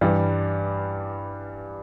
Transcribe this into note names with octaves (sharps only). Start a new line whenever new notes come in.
G2 E3 G3